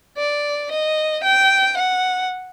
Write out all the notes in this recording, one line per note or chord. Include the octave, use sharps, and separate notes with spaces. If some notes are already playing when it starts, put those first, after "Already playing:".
D5
D#5
G5
F#5